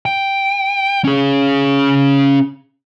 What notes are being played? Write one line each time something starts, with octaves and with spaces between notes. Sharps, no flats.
G5
C#4 G#4